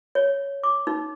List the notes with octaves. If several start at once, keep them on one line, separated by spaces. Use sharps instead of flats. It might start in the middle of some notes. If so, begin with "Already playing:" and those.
C#5
D6
D#4